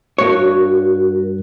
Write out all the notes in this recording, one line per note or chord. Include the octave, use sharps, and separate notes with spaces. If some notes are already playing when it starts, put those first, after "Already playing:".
G2 F#4 A#4 C#5